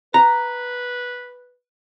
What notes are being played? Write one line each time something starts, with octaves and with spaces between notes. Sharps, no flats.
B4 A#5